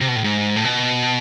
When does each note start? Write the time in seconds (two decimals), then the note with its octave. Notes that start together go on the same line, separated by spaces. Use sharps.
0.01 C3
0.08 B2
0.16 A2
0.24 G#2
0.56 A2
0.64 B2